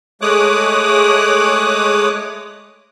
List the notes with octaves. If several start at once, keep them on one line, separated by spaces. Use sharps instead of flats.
G#3 A3 C#5 D6 D#6 F#6